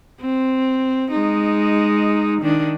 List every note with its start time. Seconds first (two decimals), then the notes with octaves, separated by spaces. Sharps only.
0.21 C4
1.11 G#3 D#4
2.41 D#3 D4